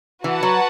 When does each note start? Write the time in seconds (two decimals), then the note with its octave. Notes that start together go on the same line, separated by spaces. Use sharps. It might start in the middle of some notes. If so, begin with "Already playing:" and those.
0.24 E3 F#4 B4 F#5 A5
0.43 F#3